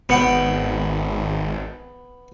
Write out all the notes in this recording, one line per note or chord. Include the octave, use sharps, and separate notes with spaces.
G#1 B3 F#5 G5